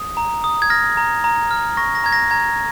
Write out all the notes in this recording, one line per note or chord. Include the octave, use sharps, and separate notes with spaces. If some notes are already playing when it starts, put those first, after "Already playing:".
Already playing: D#6
A#5
D#6
G#6
F6 A#6
A#5
A#5
F6
C#6 A#6
A#6
A#5 G#6
A#6
A#5 G#6